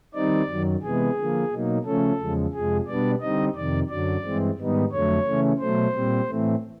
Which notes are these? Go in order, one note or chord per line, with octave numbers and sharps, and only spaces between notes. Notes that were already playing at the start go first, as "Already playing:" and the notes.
D#3 G3 C4 D#4 D5
F#2 D#3 F#3
C3 E3 G#3 B3 G#4
D3 F3 A#3
B2 F#3 A#3 D#4
C#3 F3 A3 C#4 A4
E2 C#3 F3 G#3
F2 C3 F3 G#3 G#4
B2 G3 B3 D4 D5
D3 G3 C4 D#4 D#5
F2 C3 D#3 D5
F#2 D3 F#3 D5
G2 E3 G#3 C4
G#2 D#3 G3 B3 D#4
F2 D3 F#3 A3 C#5
C#3 E3 A3 C#4
B2 F#3 A3 C5
A#2 G3 C4
A2 E3 A3 C4